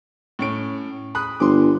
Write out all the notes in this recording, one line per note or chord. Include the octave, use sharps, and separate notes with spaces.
A2 C#4 D7
B5 D#6 F#6
G1 C6 D6